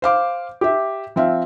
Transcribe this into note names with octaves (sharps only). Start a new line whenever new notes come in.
C5 F5 D6
G4 E5
F3 C4 E5 F5